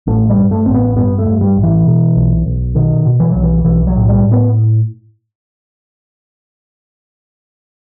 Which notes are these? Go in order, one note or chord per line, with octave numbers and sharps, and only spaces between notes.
A1 A3
G3
G2
A3
A1 C4
B3
G2 B3
A3
G2
G3
A1
E3
B2
B1
B1
B2 D#3
B2
E3
B1 F#3
E3
B1 E3
F#3
A2
G3
A2
B3